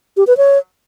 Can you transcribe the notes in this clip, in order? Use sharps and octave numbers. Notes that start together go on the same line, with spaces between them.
G4
B4
C#5